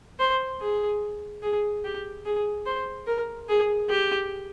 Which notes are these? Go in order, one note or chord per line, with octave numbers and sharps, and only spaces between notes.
C5
G#4
G#4
G4
G#4
C5
A#4
G#4
G4